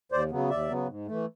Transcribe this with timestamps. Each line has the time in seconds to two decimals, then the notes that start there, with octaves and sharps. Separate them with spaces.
0.12 D#2 C5 D5
0.31 C#3 F#3 B3
0.50 D#2 D5 E5
0.69 C#3 F#3 B3
0.88 G#2
1.07 E3 A3